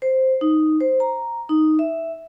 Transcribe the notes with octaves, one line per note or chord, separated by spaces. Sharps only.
C5
D#4
C5
A#5
D#4
E5